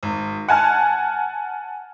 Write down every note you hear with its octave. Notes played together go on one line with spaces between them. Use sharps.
G#1
F#5 G#5 A5 F6